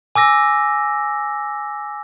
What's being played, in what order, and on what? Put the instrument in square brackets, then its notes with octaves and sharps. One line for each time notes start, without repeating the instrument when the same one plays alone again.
[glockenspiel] G#5 D6 E6 A#6